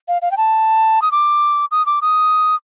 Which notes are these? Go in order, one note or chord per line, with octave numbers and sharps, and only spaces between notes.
F5
F5
G5
A5
D#6
D6
D#6
D6
D#6